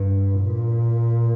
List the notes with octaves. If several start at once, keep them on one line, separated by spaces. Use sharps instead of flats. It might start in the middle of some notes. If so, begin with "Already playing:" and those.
Already playing: G2
A#2